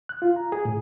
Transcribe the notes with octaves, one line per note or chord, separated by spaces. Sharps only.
F#6
F4
A#5
G#4
A2